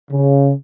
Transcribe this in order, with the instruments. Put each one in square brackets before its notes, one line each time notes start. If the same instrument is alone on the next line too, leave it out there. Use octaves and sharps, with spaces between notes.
[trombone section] C#3